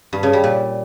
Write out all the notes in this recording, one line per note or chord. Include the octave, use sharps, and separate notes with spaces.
G2
C#3
G3
A#2